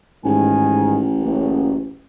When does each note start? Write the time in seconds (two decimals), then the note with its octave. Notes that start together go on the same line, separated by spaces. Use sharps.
0.25 A1 G#2 D#3 G#5
1.20 F#1